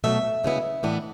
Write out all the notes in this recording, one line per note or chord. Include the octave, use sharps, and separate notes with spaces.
B2 F#3 A3 E5
D2 C#3 G#3 B3 E4
A2 E3 B3 D4